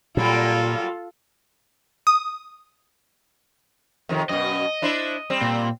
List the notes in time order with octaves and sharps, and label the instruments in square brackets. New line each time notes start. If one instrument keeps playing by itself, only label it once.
[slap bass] A#2 [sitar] F#3 G3 A#3 [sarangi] F4 [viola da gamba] A4
[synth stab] D#6
[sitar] F2 C3 D#3
[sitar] F#2 B2 [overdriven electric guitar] D#5
[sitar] D4 E4 C5
G3 C4
[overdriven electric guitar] A#2